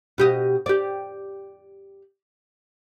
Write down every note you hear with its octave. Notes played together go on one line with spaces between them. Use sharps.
B2 G4 D#5
G4 D5